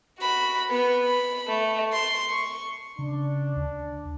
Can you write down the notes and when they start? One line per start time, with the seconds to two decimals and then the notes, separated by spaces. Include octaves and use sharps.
0.19 F#4 B5
0.70 B3
1.04 B5
1.48 A3
1.93 C6
2.30 C#6
2.99 C#3 D4
3.56 D2